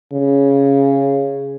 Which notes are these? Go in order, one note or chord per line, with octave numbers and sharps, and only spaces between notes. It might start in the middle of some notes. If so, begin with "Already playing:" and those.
C#3